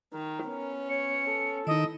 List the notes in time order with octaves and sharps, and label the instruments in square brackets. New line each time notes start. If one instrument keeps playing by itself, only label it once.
[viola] D#3 [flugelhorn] A#4
[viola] B3 C#4
[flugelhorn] C#5 [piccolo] C#7
[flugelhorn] A4
[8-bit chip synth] D#3 D#4 [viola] E4 [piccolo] D#5